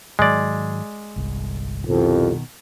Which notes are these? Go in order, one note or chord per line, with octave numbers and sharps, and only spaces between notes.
G#2 D#3 F#3 G#3 D5
G1 C2
C2 F2 B2 D#3